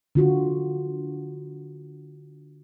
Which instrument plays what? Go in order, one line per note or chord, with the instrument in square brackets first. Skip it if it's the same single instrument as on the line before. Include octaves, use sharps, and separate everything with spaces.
[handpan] D3 F4 F#4